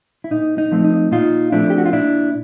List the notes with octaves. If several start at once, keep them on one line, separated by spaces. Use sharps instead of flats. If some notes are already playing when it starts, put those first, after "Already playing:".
E4
A#2 D#4
D#4
F3 A3 C4
D#4
A#2 D#4 F4
F3 A3 C4 D4 E4
G4
F#4
F4
A#2 D4 E4